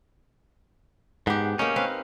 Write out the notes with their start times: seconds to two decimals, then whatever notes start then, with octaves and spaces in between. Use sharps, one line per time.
1.27 G#2 B3 G4
1.59 A#3 C#4 D#4
1.76 C4 B4 F5